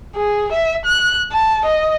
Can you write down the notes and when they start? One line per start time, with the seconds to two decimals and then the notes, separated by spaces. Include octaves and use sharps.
0.16 G#4
0.52 E5
0.85 F#6
1.32 A5
1.65 D#5